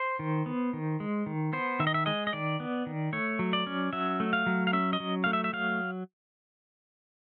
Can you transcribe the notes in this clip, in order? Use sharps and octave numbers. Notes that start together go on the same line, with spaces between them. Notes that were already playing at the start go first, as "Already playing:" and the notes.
Already playing: C5
D#3
B3
D#3
G#3
D#3
B3 C5
D#3 E5
D#5
E5
G#3 D#5
D#5
D#3 D5
B3
D#3
A3 C#5
F#3
D5
C#4
F#3 E5
A3
F5
F#3
F5
C#4 E5
D#5
F#3
A3 F5
E5
E5
F#3 F5